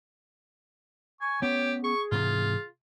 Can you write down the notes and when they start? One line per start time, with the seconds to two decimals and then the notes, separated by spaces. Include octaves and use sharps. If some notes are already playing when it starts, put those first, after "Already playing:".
1.21 G#5 C#6
1.42 B3 C#4 G4 C#5
1.84 G#4 C#6
2.12 G#2 C3 E3 F4